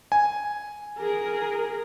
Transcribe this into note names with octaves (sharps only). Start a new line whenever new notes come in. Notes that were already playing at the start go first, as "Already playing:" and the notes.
G#5
G#4 A#4